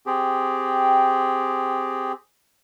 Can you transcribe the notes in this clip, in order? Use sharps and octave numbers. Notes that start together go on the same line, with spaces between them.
C4 G4 G#4